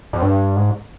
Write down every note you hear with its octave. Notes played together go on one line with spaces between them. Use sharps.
F2
G2
G#2